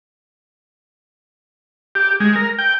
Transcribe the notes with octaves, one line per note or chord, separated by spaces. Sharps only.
G4
G#3
A#4
G5